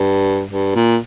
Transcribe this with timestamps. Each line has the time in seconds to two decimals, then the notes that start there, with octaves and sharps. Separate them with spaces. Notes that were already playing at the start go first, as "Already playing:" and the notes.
Already playing: G2
0.51 G2
0.75 A#2